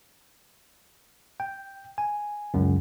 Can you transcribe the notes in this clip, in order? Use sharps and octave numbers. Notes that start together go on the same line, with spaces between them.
G5
G#5
C#2 F#2